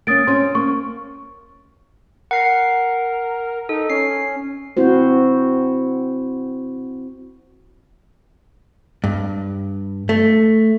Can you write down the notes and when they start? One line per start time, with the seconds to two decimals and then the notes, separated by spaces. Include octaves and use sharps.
0.07 A#3 C#4 D#6 A6 D7
0.27 C4 C#4 C6
0.55 A#3 C#6
2.31 A#4 F#5 C7
3.69 D#4 A4
3.90 C#4 C7
4.77 C4 E4 F#4 C5
9.04 G2
10.09 A3